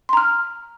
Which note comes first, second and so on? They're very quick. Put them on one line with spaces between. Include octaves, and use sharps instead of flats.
C6 A#5 F6